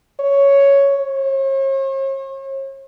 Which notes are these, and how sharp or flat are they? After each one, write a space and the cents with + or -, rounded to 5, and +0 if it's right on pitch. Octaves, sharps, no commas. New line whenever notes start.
C#5 +5
C#5 -45